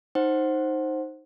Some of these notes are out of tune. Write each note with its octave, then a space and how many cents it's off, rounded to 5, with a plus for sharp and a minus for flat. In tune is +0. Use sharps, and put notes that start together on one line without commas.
D#4 +0 C5 +15 F#5 +0